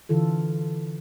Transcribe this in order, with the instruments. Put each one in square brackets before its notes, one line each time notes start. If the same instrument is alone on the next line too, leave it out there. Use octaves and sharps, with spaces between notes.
[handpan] D3 E3 F4 A4